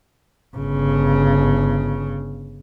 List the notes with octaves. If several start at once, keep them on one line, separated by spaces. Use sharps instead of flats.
G1 C#3